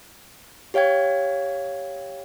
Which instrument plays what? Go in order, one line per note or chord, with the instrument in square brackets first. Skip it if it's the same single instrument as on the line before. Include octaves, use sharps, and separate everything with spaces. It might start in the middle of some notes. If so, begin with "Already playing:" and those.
[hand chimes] G4 C#5 F5 G5 G#6